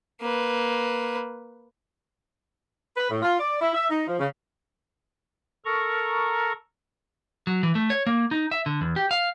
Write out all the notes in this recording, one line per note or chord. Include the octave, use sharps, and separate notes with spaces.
A#3 B4
B4
A2
F4
D5
E4
E5
D#4
F3
C#3
A4 A#4 A#5 C#6
F#3
E3
A3
C#5
A#3
D#4
E5
D3
E2
G4
F5